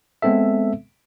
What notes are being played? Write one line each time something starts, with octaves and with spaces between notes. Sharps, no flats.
G#3 B3 C4 A4 E5